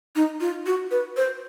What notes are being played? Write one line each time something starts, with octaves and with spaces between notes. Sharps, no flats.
D#4
F4
F#4
B4
C5